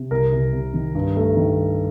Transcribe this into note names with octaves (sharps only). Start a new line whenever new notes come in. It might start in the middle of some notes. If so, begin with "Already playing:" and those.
Already playing: C3
C2 A#4
C2
C3
D#3
G2
A3
D#3